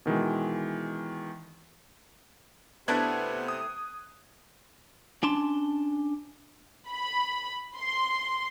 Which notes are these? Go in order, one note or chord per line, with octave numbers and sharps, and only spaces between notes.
B2 D#3 E3 G#3
C3 A3 B3 D4 E4 F#6 G#6
D#6
C#4 D4 A5 C6
B5
C6